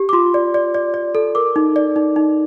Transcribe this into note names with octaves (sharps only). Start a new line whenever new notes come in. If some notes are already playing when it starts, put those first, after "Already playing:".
Already playing: G4
D6
F4 C6
D5
D5
D5
D5
A4
A#4 D6
D#4
D5
D#4
D#4